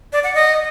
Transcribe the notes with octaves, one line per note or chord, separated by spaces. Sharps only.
D5
F#5
D#5